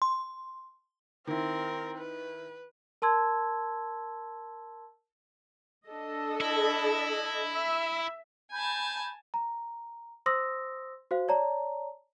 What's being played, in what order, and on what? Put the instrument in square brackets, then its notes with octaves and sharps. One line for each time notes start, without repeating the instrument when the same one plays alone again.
[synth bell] C6
[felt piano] D#3 E4 [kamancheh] C4 A#4
[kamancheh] B4
[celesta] A#4 A5 C6 E6 G#6
[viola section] D4 A4 D#5
[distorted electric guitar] E4
[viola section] E5
[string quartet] G#5 A5 [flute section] B5 G6
[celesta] A#5
C5 C6 D#6 E6 A#6
F#4 C5 F5
C#5 D5 A5 A#5